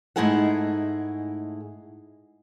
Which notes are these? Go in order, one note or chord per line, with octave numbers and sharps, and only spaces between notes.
G#2 A3 D#4 E4 G#4 F#5